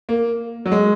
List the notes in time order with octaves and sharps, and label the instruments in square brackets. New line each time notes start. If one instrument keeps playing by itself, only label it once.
[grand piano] A#3
F#3
G#3